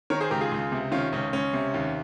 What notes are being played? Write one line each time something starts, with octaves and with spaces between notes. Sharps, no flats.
D#3 A#4 C#5
G#4 C5
C#2 G4 A#4
F4 G#4
C#2
C3
D#3 C#4 F4
C#2 C#4
C#2 C#4
C3
D#2